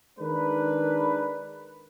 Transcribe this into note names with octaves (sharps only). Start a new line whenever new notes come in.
D#3 G#3 D4 A#4 B4